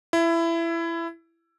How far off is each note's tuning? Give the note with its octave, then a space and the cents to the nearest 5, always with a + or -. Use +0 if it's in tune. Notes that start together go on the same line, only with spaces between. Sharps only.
E4 +20